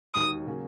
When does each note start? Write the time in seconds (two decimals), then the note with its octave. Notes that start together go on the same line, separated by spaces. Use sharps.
0.14 E1 D#2 D#3 D#6
0.46 C#3 F#3 A#3 C#4